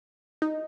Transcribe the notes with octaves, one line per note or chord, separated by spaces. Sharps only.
D#4